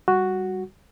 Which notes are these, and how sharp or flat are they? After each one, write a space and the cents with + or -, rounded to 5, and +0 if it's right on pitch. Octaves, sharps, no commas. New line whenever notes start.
G3 +0 F#4 +0